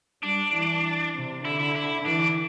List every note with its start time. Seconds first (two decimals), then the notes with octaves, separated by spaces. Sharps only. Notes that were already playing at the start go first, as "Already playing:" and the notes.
0.22 G3 D4
0.54 E3
1.14 C3
1.45 D3 E4
1.60 E4
1.75 E4
2.05 E3 D4